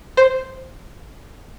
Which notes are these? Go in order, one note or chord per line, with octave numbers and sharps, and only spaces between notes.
C5